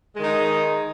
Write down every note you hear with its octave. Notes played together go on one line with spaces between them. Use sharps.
D#3 G#3 D#4